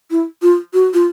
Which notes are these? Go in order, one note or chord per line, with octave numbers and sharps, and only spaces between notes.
E4
F4
F#4
F4